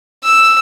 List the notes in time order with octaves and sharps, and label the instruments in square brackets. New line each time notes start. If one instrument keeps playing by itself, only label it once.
[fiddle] E6